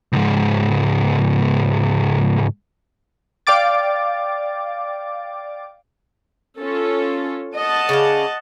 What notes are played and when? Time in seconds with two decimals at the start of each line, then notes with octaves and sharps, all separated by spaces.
0.13 C#2 G#2
3.47 D5 F5 G5 D6 A6
6.59 C#4 F4 A4
7.55 D#5 F#5 A5
7.89 C#3 D5 F5